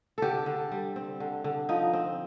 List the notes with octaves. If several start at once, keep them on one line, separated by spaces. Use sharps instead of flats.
D3 G4 A4
D3
G3
C4
D3
D3
F3 D#4
C4